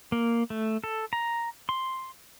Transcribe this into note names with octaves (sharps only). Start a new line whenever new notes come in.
A#3
A3
A4
A#5
C6